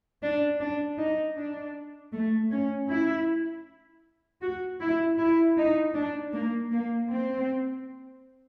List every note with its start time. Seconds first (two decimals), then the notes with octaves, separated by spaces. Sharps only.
0.22 D4
0.60 D4
0.98 D#4
1.37 D4
2.13 A3
2.51 C#4
2.89 E4
4.42 F#4
4.81 E4
5.19 E4
5.57 D#4
5.95 D4
6.33 A#3
6.72 A#3
7.09 C4